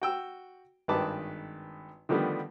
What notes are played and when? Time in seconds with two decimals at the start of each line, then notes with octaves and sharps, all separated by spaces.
0.02 F#4 G5 E6
0.88 G#1 G2 D#3 B4 A5 D6
2.09 D3 D#3 F3 G3 A3 B3